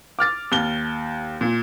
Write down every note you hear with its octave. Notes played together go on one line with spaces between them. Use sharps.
D6 F6 A6
D#2 G7
A#2